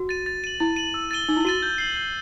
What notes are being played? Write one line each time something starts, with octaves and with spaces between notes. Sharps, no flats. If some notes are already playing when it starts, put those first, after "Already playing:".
Already playing: F#4
A6 D#7
A6
D#7 F#7
E4 A6
D#7 F#7
E6
A6 D#7 G7
D#4 E6
E4
F#4 A6 D#7 G7
G6
C7 F#7
G6